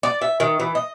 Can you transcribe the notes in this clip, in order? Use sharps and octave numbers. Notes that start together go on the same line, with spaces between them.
D5
E5
D#3
E3
D#5